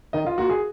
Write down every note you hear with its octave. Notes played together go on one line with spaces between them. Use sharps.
D#3 D#5
F4
A#3 F4 F#4
G#4